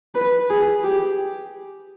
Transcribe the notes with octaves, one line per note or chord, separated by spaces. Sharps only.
B4
G#4
G4